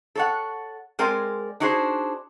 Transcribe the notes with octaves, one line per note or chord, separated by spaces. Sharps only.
A4 C#5 F#5
G#3 C4 A#4 D5 G#5
D4 D#4 F#4 G#4 C5